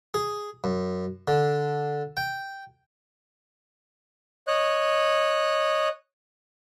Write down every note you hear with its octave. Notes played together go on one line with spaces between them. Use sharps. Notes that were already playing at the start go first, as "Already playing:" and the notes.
G#4
F#2
D3
G5
C#5 D#5 F#6